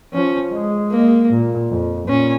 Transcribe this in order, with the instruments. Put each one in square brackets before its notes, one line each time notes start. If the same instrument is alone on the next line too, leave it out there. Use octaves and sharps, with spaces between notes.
[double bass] F3 [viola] C#4
[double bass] G#3
[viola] A#3
[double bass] A#2
F2
[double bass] A#2 [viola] C#4